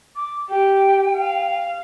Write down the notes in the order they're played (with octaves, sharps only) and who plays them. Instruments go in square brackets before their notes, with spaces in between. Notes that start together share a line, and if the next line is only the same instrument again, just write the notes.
[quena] D6
[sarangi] G4 [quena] G5
[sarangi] F5